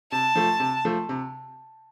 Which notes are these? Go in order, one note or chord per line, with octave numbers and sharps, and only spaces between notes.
C3 A5
F3 A3
C3
F3 A3
C3